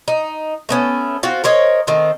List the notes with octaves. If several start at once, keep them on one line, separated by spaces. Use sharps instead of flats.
D#4
A3 B3 C#4
C4 F4 F#4
A#4 C5 C#5 D#5
D#3 A3 C4